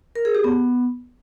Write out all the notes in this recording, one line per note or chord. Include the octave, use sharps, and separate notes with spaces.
A#4
G#4
G4
B3